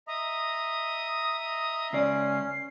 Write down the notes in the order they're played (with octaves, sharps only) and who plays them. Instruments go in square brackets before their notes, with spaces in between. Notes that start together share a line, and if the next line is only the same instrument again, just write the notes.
[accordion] D#5 E5 A#5 [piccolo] D#6
[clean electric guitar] C#2 D5 [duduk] C#4 [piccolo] C7